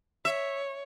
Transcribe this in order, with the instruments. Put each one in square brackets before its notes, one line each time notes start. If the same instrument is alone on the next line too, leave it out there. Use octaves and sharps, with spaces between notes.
[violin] C#5 [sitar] E5